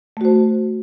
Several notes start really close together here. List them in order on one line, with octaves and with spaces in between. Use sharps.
A3 F#4 C5